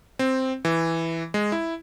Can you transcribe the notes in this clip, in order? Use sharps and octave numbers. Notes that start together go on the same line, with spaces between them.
C4
E3
G#3
E4